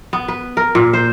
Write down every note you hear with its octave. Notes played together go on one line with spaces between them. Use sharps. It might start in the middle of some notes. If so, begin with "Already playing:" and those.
B3
B4
A#4
A#2
C5